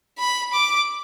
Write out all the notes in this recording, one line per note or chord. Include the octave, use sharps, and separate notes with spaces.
B5
D6